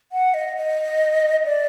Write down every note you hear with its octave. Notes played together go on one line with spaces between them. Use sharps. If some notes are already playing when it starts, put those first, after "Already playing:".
F#5
D#5
D#5
D5